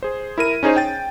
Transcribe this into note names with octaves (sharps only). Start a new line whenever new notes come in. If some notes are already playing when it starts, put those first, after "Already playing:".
G#4 C5
E4 A#4 D#7
C#4 D#4 G#4 C5 C#5
G5 A6